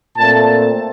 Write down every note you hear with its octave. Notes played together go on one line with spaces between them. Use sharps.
A#2 A3 C4 A5